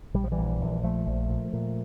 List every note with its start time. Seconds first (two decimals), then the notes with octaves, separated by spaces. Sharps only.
0.14 A#1 G3
0.24 F3
0.32 E3 G3
0.38 A#1
0.61 A#1
0.83 A#1 F3 A3
1.06 A#1
1.29 A#2
1.53 A#2